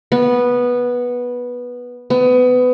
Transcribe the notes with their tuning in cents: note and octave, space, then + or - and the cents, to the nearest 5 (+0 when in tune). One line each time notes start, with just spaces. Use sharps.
B3 -10
B3 +25